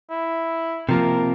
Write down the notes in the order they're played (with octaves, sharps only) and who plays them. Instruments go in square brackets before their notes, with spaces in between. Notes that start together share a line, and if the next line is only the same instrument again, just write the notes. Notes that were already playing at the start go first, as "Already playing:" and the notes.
[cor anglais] E4
[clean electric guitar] C3 F3 A#3 [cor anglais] A#4